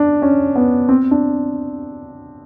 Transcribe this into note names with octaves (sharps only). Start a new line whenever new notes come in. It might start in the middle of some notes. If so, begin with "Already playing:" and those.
Already playing: D4
C#4
B3
C4
D4